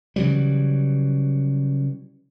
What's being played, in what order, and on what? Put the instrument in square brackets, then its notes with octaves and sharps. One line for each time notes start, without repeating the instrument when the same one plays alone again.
[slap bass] C#3 E3 F#3 G3